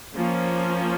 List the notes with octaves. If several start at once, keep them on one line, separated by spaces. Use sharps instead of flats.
F3 A#3 C#4